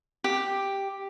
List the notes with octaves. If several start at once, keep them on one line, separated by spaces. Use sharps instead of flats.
G4